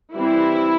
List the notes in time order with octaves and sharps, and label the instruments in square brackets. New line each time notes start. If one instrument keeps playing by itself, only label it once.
[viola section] E3 G3 C4 E4